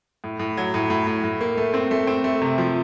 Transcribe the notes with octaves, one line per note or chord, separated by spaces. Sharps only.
A2
A2
F#3
A2
A2
A2
A2
A#3
A3
C4
A3
C4
A3
C3
F3